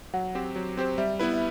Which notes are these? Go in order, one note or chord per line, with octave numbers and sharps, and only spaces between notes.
F#3 F#5
C4 G4 C5
F#3
C4 G4 C5
G3 E5
B3 E4 B4
E5